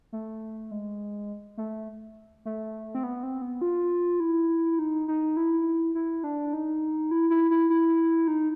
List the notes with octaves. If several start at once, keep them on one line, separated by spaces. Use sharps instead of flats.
A3
G#3
A3
A3
C4
B3
C4
B3
F4
E4
D#4
D#4
E4
E4
D4
D#4
E4
E4
E4
E4
D#4